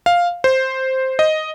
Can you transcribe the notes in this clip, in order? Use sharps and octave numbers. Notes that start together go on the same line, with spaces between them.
F5
C5
D#5